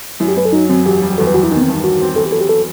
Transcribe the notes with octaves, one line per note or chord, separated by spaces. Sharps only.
F#2 E4
G4
F#2 B4
A4
F#3 D#4
F#2 C4
E1 G4
G3
E2 A4
B4
E2 F#4
E4
D#3 D#4
B3
C4
G2
D#4
F#3 F#4
C4
E2 A4
G4
F#3 A4
G4
A4